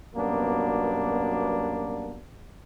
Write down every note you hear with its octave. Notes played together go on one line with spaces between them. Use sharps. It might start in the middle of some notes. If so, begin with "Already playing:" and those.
F#2 B2 G3 A#3 B3 D4